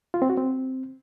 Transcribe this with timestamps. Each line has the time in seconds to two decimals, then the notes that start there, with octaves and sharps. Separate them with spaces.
0.14 F4
0.22 C4
0.30 F#4
0.37 C4